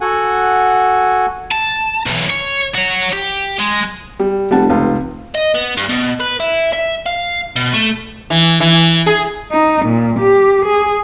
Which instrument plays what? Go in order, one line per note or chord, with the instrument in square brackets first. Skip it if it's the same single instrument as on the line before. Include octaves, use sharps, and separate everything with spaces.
[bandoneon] F#4 A4 F#5 G#5
[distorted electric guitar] A5
B1 E3
C#5
F#4 C#5
G4
G#3
[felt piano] G3
[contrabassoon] F1 [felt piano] G3 F#5 A5
[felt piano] C#2 F4
[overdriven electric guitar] D#5
B3
G2
B2
B4
E4
E5
F5
B2
A3
[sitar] E3
E3
G#4
[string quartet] D#4
A#2
G4
G#4